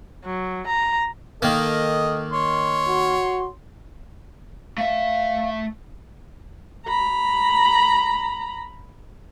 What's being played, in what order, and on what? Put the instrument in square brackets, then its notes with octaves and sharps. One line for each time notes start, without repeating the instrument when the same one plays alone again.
[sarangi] F#3
A#5
[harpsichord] D#3 A#3 [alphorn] A4 [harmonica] D#5
[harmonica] C#5 C6
[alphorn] F#4
[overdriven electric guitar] A3 E5 [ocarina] F5
[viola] A#5 B5